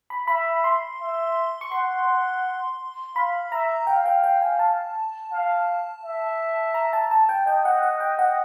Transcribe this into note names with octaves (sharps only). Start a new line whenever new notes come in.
B5
E5 B5
C6
E5
C#6
F#5 C6
F5 B5
E5 A#5
F5 G5
G5
G5
G#5
A5
F5
E5
A#5
A5
A5
G5
D#5 G5
F#5
F#5
G5
F#5